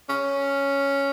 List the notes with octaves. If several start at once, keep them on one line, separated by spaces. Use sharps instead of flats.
C#4